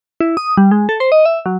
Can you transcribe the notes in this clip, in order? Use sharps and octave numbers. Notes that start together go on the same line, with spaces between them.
E4
D#6
G3
G#3
A4
C5
D#5
E5
F#3